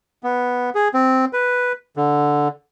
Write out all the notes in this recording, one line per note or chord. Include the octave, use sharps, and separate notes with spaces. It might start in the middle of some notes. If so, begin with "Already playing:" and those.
B3
G#4
C4
B4
D3